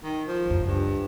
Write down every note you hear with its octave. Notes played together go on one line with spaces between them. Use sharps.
D#3
F3
C#2 F#2
G2